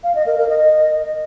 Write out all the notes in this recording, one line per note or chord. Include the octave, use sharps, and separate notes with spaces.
F5
D#5
A#4
A#4
D#5